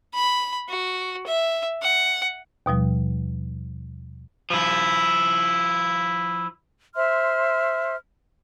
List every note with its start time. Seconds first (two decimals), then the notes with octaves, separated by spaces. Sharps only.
0.15 B5
0.69 F#4
1.27 E5
1.82 F#5
2.66 D#2 B2 F3 G3
4.50 F3 E4
6.95 C5 E5 C6 F6